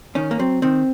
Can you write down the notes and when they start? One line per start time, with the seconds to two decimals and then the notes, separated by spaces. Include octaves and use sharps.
0.15 D#3 C#4
0.31 A#3
0.39 F#3 C4
0.62 D#3 C4